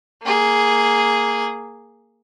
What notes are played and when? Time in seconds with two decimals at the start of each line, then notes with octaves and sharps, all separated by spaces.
0.23 A#3 G#4